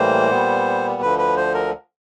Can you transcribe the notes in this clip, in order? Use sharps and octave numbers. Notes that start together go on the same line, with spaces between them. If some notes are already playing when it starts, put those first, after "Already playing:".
Already playing: A2 E3 G3 A#3 C5
A#2 G3 B3
D2 D3 F3 B4
B4
C5
A#4